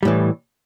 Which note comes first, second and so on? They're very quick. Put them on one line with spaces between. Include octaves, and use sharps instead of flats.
G3 A2 E3